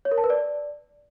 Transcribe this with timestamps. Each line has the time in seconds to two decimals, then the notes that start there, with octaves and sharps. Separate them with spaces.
0.05 C#5
0.11 A#4
0.18 A5
0.24 B4
0.30 D5